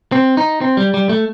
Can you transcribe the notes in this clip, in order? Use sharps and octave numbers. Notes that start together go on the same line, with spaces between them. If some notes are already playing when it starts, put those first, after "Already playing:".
C4
D#4
C4
G3
G3
A3